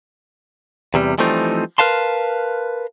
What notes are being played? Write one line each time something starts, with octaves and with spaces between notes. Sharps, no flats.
E2 C3 G3
E3 F3 G3 A3 C4 D#4
A#4 B4 F5 A5 C6